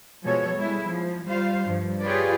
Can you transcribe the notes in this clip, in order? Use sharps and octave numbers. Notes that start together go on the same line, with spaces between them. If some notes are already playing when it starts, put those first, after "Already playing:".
B2 F3 G#3 A4 C#5
G3 G#3 E4
F3
G3 F4 C5 F5
G2 F3
F4 G4 G#4 B4 C#5 D5